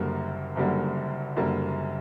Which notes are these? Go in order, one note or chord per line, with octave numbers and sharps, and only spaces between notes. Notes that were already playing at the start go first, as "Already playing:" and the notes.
Already playing: F#1 F#2 D3 G3 A#3
F#1 F#2 D3 G3 A#3
F#1 F#2 D3 G3 A#3